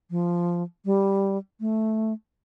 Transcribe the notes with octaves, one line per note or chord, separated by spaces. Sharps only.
F3
G3
A3